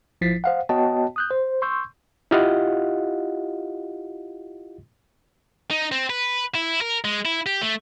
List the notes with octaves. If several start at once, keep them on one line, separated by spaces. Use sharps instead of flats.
G#1 F3 E4 A6 B6 C7
C5 F5 F#5
B3 F#4 C#5 D#5 G5 A5
D#6 F#6 G6
C5
C6 C#6 E6 G6
E4 F4 G4 D#5 F5 F#5
D#4
C4
B4
E4
A#4
G#3
E4
G4
A3